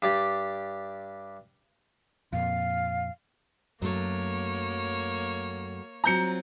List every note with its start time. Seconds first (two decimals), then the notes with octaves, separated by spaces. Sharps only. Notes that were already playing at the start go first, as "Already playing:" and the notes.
0.02 G2 G4 D5
2.33 F2 A#2 F5
3.82 F#2 F#3 A3 A#3 C#5
6.04 F#3 C4 F4 A#5 G6 C#7